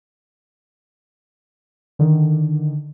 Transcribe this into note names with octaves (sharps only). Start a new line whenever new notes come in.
D3 D#3